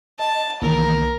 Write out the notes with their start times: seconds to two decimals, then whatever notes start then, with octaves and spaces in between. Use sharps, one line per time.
0.19 D#5 A5
0.62 C2 D#3 E3 A#3 A#4